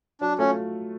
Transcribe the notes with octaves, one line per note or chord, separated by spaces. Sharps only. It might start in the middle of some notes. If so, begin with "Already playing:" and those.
F#3 D4
A3 C#4 F4 A4